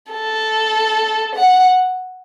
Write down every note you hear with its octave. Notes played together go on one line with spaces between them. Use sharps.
A4
F#5